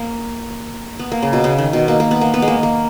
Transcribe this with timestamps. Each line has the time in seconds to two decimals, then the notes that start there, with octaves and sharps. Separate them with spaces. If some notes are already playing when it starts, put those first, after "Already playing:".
Already playing: A#3
0.99 B3
1.12 A#3
1.22 C#3
1.33 B2
1.44 C#3
1.58 D#3
1.73 B2
1.88 A#3
2.00 A#3
2.11 B3
2.21 A#3
2.34 B3
2.42 G#3
2.48 A#3
2.63 A#3